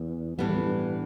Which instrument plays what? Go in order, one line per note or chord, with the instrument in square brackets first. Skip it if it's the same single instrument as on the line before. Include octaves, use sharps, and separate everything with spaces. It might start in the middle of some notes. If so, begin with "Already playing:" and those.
Already playing: [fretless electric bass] E2
[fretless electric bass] F2 [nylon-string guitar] A2 E3 G3 B3
[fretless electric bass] E2
F2
G2